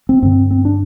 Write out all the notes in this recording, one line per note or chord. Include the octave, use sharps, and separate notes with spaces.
C4
G2 D3 C4
C4
D4